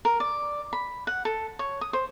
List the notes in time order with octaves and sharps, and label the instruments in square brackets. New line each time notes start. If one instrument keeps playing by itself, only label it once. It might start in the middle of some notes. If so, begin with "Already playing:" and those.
[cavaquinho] A#4
D5
B5
F#5
A4
C#5
D#6
C5